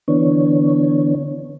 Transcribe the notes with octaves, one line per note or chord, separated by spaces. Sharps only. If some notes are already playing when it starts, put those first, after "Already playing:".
D3 E3 B3 D4 C#5